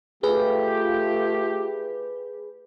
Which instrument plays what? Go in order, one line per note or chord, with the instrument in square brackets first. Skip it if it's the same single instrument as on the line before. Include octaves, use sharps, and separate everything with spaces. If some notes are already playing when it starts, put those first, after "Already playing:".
[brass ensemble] A3 F4 G4 [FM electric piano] G#4 B4